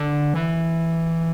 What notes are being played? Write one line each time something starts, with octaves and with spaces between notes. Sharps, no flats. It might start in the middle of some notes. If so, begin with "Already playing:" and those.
Already playing: D3
E3